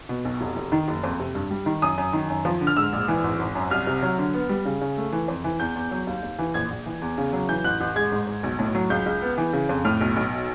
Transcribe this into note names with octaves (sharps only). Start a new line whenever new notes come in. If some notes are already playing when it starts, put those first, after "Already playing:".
B2
B1
F1
F1
D#3
F#1
F2
C3
G2
G3
D#3
F#2 D#6
F#2
D#3
F#2
F3
D3
F6
G#2 E6
A#1
E3
G#1
G#1
F#2
C2 F6
C3
F#3
D3
B3
G3
C#3
C#3
A3
E3
F2
E3
E2 G6
E2
F#3
D#2
D#2
E3
A#1 G#6
A#1
E3
E2
C#3
F#3
E3 G6
A1 F#6
A1
G#3 G#6
G#2
G#2
B1
A2
F#3
C#2 G6
C#2
B3
E3
C#3
F2
A2 F6
B1
B1